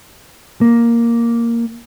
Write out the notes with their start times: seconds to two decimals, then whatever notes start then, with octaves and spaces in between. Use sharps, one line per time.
0.61 A#3